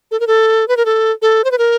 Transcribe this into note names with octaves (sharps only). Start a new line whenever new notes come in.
A4
A#4
A4
B4
A#4
A4
A4
C5
B4
A#4